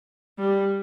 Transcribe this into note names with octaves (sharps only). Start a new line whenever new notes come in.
G3